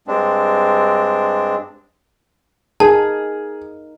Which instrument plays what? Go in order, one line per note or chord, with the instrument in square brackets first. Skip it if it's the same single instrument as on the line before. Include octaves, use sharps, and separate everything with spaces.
[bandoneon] G2 G#3 C4 D4
[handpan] D#4 A#4 [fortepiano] G#4 [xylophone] A5